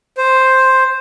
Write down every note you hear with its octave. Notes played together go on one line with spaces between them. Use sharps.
C5